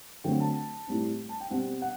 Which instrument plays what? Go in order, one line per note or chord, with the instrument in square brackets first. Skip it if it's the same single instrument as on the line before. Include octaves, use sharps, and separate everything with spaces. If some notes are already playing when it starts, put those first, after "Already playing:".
[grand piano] D3 F#3 A3 C4 G5
A5
A2 G3 C4
A5
G5
B2 G3 C4 F#5
F#5